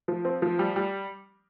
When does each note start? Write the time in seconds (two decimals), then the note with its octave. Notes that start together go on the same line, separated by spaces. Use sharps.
0.08 F3
0.25 C4
0.42 F3
0.59 G3
0.76 G3